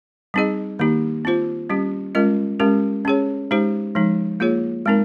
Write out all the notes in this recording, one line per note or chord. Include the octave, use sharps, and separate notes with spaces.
G3 C4 D#4 G#4 D#5
D#3 A#3 D#4 G4
C4 F4 C5
G3 C#4 G4
G#3 C#4 F4 A#4 D#5
G#3 C#4 G4 A#4
C#4 G#4 C#5
G#3 D#4 G4 C5
F3 G#3 D#4
A#3 F4 G#4 C#5
G#3 C4 D#4 A#4